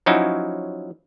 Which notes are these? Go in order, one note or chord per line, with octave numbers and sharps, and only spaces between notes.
F3 F#3 C#4 D#4 E4 F#4